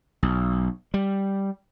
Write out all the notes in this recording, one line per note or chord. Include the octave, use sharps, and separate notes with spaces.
B1
G3